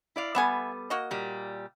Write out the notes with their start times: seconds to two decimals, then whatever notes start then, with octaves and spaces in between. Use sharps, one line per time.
0.16 E4 D5 F5
0.35 G3 B3 A4 E5 F#5 G#5
0.90 A#3 F#4 D#5
1.11 A#2 G3